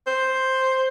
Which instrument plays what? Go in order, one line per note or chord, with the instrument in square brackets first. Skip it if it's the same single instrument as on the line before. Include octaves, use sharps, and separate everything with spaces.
[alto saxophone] C5